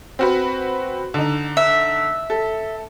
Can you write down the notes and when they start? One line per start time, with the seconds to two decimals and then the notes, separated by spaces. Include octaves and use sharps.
0.19 C4 F#4 B4
1.14 D3 D#4
1.57 E5
2.30 A4